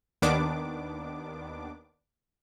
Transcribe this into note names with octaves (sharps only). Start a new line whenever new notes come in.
D#2 D#3 B3 D4 D6